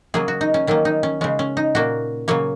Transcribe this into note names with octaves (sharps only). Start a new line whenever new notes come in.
C#3 F#3 A#3 G#4
F#4
D#4
C#4
D#3 F#3 A#3 C#4
D#4
C#4
C#3 G#3 C#4
C#4
D#4
A#2 A#3 F#4
C#3 F#3 A#3 C#5